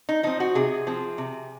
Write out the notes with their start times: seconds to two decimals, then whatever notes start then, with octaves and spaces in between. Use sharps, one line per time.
0.09 D#4
0.23 F3 C4 D#4
0.40 F#4
0.55 C3 G#4
0.87 F3 C4
1.18 C3